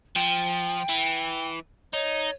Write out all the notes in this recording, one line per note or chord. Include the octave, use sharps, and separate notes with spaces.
F3 G5
E3
D#4 C#5